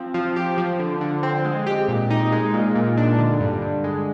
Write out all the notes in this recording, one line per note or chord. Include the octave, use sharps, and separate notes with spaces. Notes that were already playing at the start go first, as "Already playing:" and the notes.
Already playing: F3 C4
F3
G4
F3
D3
D3
C4
G#3
G4
A#2
D#4
G#3
A#2
A#2
D4
D3
G2
G2
G#3